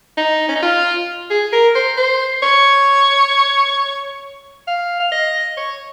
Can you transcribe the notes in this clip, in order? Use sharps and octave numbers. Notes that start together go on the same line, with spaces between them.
D#4
C#4
D#4
F4
G#4
A#4
C5
C5
C#5
F5
F5
D#5
C#5